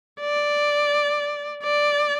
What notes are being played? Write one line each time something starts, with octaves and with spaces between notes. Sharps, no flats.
D5
D5